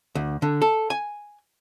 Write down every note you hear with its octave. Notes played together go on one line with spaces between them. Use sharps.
D2
D3
A4
G#5